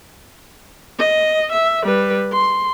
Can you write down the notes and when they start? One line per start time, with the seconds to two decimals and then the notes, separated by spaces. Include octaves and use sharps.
0.99 D#5
1.52 E5
1.84 G3 B4
2.33 C6